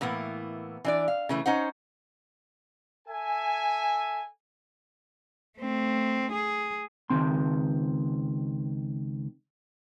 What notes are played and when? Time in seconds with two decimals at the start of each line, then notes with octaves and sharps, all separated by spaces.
0.01 A2 E3 A#3 B3
0.84 E3 D4 D5
1.08 F5
1.29 C#3 E3 A3
1.46 C#4 D#4 C5 F#5
3.08 A4 E5 G#5
5.59 A3 C4
6.32 G#4
7.10 C#2 D#3 C4 C6